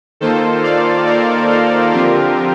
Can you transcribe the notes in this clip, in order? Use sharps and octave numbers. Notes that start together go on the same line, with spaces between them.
D#3 A#3 F4 A4 C5
D5 F5
A#4 D5
A4 C5
D3 F3 C4 F4 G4 A#4